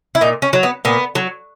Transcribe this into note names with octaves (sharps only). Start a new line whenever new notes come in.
E4
A#2 D#4
C#4
F#3
B3
A#2 B3
F#3